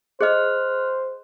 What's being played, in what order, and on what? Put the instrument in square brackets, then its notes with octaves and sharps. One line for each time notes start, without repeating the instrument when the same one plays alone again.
[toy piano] G#4 D#5 [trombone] C5 [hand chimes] F6 F#6